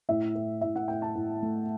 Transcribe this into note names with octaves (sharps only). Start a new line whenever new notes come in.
A2 E5
A2
A2 E5
F#5
A2 G5
A5
A2
A3